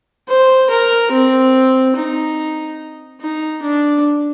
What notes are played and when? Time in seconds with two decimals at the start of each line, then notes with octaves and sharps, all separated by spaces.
0.29 C5
0.70 A#4
1.12 C4
1.96 D#4
3.21 D#4
3.62 D4